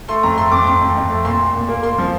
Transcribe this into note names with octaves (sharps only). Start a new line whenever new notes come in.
A3 C6
F2 A#5
A3 C6
F2 D6
F2 C6
F2
F2
A3
A#2 C6
A#2
A#2
A#3
A#3 C6
F3